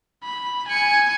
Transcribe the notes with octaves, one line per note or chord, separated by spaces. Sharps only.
B5
G#5 C#7